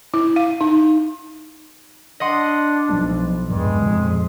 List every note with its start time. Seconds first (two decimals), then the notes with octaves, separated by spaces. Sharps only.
0.14 E4
0.36 F5
0.61 D#4
2.20 D4 D#5 F#5 C6
2.89 B1 F3
3.50 E2 G2 G#3
3.82 F2 A#2